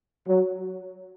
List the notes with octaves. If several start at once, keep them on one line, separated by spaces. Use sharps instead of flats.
F#3